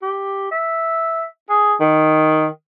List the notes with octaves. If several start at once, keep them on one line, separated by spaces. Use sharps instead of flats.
G4
E5
G#4
D#3